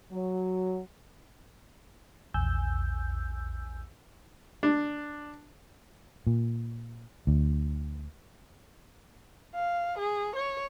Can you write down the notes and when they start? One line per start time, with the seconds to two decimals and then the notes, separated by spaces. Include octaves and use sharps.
0.11 F#3
2.34 A#1 E2 G#5 E6 G6
4.63 D4
6.27 A#2
7.27 D2
9.55 F5
9.98 G#4
10.36 C#5